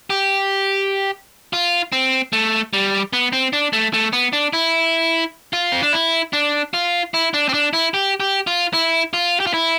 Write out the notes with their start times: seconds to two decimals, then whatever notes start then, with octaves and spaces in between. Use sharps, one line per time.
0.10 G4
1.53 F4
1.92 C4
2.33 A3
2.73 G3
3.13 B3
3.33 C4
3.53 D4
3.73 A3
3.93 A3
4.13 B3
4.33 D4
4.53 E4
5.53 F4
5.72 C4
5.83 D4
5.93 E4
6.33 D4
6.74 F4
7.14 E4
7.34 D4
7.49 C4
7.54 D4
7.73 E4
7.94 G4
8.20 G4
8.47 F4
8.73 E4
9.13 F4
9.40 G4
9.47 F4
9.54 E4